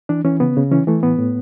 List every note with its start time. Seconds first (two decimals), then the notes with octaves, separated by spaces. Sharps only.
0.09 E3 D4
0.24 E3 C#4
0.40 C#3 B3
0.57 C#3
0.71 E3 C#4
0.87 E3 A3
1.03 A2 B3
1.18 A2